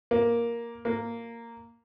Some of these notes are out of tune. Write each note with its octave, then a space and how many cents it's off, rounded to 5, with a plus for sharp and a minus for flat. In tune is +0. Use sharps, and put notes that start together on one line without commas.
A#3 +5
A#3 -10